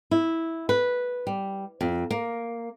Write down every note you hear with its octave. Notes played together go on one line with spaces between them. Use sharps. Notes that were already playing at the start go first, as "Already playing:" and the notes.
E4
B4
G3
F2
A#3